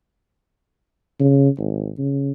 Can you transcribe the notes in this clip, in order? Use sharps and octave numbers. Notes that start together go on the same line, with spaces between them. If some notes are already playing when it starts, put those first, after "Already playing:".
C#3
G#1
C#3